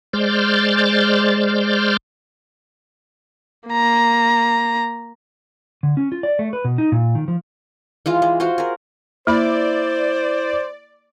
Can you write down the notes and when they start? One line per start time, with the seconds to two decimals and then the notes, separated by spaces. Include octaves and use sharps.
0.13 G#3 C5 D5 F6 G6 A6
3.69 A#3 A#5
5.83 D3
5.97 C#4
6.12 F4
6.23 D5
6.39 A3
6.53 B4
6.65 B2
6.78 D#4
6.92 A#2
7.15 D#3
7.28 F3
8.06 E3 G#3 F4
8.22 G#3
8.40 F4 F#4 C5
8.58 G#4 A#4
9.27 A#3 E4 C5 D5 B5